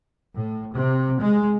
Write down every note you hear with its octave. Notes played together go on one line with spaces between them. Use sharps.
A2
C3
G#3